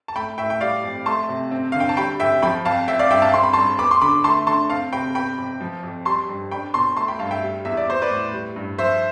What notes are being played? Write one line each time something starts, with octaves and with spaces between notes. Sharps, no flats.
A5
A3 G5 B5
A2 E5 G5
G5
G3 D5 F5
F2
A3 A5 C6
C3
C4
D3 F5
G5
A5
G3 G5 B5
F2 E5 G5
F3 G5 B5
F2 F5 A5
C4 E5 G5
D5 F5
G2 E5 G5
F5 A5
C4 C6
B5
G2 A5 C6
B3 B5 D6
C6
D3 B5 D6
A3 A5 C6
D3 A5 C6
C4 F5 A5
C3 G5 B5
B3 G5 B5
F2
F3
F2
G3 A5 C6
G2
D4 G5 B5
B2 A5 C6
A3 A5 C6
G5 B5
G2 F5 A5
E5 G5
G3
E2 E5
D5
B3 C5
B4 D5
A2
G3
G2
F3 C5 E5